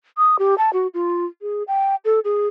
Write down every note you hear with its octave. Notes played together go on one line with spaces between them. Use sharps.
D#6
G4
A5
F#4
F4
G#4
G5
A4
G#4